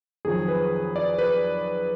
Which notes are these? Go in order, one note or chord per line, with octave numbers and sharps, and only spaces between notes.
F2 D#3 F#3 G#4
B4
D5
B4